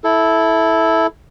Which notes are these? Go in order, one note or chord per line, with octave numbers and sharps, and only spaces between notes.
E4 A4